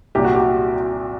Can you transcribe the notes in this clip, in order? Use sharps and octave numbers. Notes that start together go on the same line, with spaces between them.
C2 A#2 F#3 G4
F#4
G4